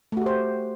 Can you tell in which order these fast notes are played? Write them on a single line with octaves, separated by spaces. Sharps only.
A3 F#4 G4 C5